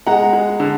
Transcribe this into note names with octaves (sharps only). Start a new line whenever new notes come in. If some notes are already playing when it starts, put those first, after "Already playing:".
G#3 F#5 A#5
G#3
D3